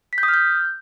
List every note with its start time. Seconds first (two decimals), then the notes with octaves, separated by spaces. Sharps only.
0.13 B6
0.18 G6
0.23 D#6
0.28 F6
0.34 G6